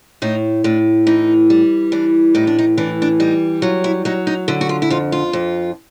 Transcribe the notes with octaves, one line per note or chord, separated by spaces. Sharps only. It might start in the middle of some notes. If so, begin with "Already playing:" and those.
A2 D#4
A2 D4
E3 D#4
G3
E3 D4
A2 D#4
D4
D#4
E3 D4
D4
G3 D#4
F#3 F4
E4
F#3 D#4
D#4
D3 E4
F#4
F4
E4
F2 F4
F4
F2